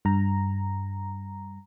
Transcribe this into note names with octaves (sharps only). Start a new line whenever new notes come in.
G2 A#5